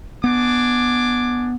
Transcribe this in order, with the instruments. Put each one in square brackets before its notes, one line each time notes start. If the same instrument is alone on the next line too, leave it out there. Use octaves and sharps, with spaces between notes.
[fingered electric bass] B3 [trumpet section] D4 G#5 D6